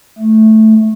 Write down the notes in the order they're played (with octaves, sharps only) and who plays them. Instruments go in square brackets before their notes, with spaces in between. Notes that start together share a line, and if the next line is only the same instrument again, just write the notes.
[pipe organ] A3